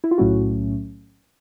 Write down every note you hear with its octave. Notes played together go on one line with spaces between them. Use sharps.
E4
F4
B1 A2 F#3 A3 C#4 E4 F#4